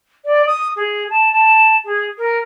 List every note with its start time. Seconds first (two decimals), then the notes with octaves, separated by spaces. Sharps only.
0.24 D5
0.46 D#6
0.75 G#4
1.10 A5
1.32 A5
1.84 G#4
2.17 A#4